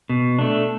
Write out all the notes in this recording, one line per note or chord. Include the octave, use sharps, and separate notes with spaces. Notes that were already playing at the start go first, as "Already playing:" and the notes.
B2
A3 D4